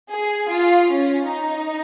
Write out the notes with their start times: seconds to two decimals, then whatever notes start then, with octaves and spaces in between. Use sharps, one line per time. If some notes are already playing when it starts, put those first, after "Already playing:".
0.10 G#4
0.48 F4
0.86 C#4
1.24 D#4